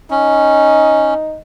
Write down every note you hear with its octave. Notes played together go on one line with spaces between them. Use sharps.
C#4 D#4